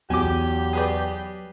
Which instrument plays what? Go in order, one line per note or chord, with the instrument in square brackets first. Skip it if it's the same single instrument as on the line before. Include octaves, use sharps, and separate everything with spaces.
[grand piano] E2 [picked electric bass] F#3 [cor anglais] G4 [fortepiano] G#5 D6
[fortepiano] G#4 B4 D5